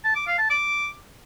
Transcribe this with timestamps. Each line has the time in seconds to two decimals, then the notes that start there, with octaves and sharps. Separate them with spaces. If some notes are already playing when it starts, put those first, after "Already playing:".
0.04 A5
0.15 D6
0.27 F5
0.38 A5
0.50 D6